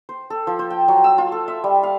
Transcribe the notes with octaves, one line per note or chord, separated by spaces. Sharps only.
C5
A4
F3
C5
G5
F#3
E6
F4
A4
E5
G3
F5